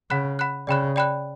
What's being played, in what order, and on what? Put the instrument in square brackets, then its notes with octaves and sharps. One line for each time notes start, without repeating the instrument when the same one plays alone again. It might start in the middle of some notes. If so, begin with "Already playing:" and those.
[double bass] C#3 [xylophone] F#5 B5 F#6
[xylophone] F#5 B5 F#6
[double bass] C#3 [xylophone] D5 G5 B5 F#6
[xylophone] D5 G5 B5 F#6